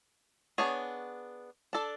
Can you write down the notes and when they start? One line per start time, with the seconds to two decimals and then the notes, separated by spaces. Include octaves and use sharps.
0.58 B3 D4 G#4 C#5
1.73 D4 A4 D5